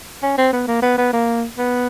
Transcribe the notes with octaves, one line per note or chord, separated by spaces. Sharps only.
C#4
C4
B3
A#3
B3
B3
A#3
B3